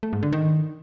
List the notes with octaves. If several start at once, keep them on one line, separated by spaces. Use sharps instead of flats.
A3
G#2
D3
D#3